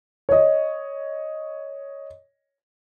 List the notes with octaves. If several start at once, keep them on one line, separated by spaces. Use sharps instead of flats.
C#5 D#5